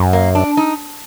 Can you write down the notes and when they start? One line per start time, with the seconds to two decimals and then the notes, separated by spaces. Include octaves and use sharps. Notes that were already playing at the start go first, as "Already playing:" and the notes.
Already playing: F#2
0.13 A#3
0.35 D4
0.57 D#4